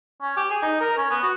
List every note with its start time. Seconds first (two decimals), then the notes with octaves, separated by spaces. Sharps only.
0.21 C#4
0.37 G4
0.51 G#4
0.62 D#4
0.81 A#4
0.97 C#4
1.11 B3
1.23 F#4